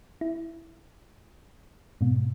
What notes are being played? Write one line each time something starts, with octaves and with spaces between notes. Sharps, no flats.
E4
G#2 B2